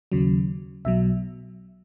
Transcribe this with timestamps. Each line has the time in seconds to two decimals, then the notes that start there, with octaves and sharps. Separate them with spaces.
0.12 D#2 C#3 F#3
0.85 B1 B2 F#3 E5